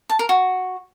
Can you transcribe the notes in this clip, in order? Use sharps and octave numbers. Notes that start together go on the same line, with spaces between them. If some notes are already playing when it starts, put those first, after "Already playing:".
A5
A#4
F#4